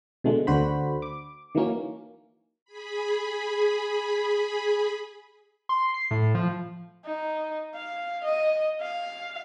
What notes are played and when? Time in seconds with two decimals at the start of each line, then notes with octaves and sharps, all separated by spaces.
0.24 B2 D3 G#3 A3
0.47 D2 D3 F#4 C5 B5
1.02 D6
1.55 D#3 E3 F#3 A#3 C#4
2.65 G#4 B5
5.69 C6
5.94 C7
6.11 A2
6.35 F3
7.05 D#4
7.75 F5
8.24 D#5
8.81 F5